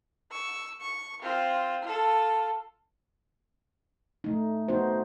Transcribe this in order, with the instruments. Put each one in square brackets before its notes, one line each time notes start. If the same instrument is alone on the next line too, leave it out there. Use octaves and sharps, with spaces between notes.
[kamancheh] C#6 E6
C#6
C4 F4
F4 A4
[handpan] A3 D#4
B3 D#4 F#4 C5